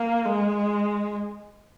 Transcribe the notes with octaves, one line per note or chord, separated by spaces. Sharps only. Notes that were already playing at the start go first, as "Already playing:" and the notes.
Already playing: A#3
G#3